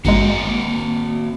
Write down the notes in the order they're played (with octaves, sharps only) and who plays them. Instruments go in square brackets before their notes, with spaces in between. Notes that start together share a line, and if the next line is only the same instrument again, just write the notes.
[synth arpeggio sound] G#1 G2 G#3 [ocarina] A#3 [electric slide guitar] C4 F#4 A#5